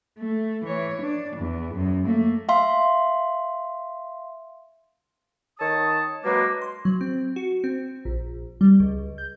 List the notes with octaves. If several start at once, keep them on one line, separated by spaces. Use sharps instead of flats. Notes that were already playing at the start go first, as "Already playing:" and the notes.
A3
E3 C#5
D4
E2
F#2
A3 A#3
E5 F5 C6
D#3 C#5 A5 D#6
F#3 G#3 A#3 D4 B4
C6
F#3
C4
F#4
C4
A#1
G3
C#2
G6